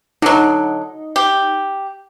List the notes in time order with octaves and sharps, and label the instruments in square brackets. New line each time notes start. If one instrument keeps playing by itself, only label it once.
[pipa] D3 F#3 [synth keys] D#4
[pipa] G4